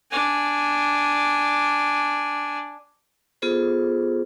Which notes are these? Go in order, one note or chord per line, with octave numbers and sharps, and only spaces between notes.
D4 G#5
B3 F4 G#4 A4 C5